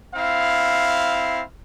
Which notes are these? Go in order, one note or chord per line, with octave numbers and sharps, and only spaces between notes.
C4 E4 F5